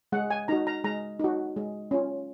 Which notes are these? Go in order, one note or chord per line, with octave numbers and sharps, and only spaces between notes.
G#3 F#5
G#5
D#4 F#4 A#5
A#5
G#3 A#5
D#4 F#4
G#3
C#4 F4